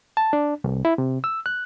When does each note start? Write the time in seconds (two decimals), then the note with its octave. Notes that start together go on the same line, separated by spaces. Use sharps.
0.17 A5
0.33 D4
0.64 C2
0.85 E4
0.98 C3
1.24 E6
1.46 F#6